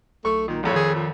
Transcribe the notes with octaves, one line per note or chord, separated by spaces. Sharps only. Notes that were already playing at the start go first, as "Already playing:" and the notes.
B1 A3 C#6
A#2 D#3
A#1 F2 A2 C#5
D#3 G#4
F3